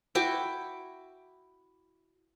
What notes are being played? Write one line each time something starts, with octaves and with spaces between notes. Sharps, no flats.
E4 F#4 G5 D6